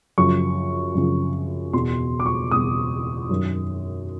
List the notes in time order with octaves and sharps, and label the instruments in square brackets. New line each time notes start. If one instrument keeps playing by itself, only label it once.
[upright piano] F#2 C#3 F3 C#6
F#2 C#3 F3
E2 B2 C6
D6
C#6
E2 B2 D#6
F#2 D#3